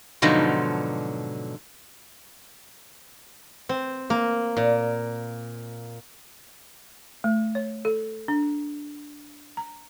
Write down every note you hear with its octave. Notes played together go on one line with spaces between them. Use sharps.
G#2 B2 D3 F3 F#3 D#4
C4
A#3
A#2
A3
C#5
A4
D4
A#5